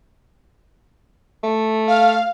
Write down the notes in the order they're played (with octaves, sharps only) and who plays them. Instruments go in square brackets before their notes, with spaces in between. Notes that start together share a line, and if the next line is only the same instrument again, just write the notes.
[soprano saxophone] A3
[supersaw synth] F5